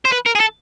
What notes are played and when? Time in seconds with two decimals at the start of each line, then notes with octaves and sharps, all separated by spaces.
0.05 C5
0.12 B4
0.26 A#4
0.35 G#4
0.40 A4